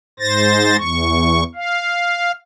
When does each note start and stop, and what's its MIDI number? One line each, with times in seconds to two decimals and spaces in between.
0.20 0.77 44
0.20 0.77 72
0.20 0.77 93
0.20 0.77 94
0.77 1.43 40
0.77 1.43 85
1.55 2.32 77